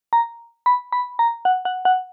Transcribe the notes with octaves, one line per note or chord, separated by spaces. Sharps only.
A#5
B5
B5
A#5
F#5
F#5
F#5